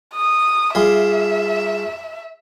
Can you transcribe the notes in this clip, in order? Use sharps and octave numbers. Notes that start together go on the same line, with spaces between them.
D#6
G3 F4 G#4 E5